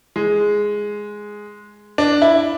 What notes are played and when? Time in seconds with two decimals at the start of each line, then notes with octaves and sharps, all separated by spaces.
0.16 G#3
1.98 D4
2.22 E4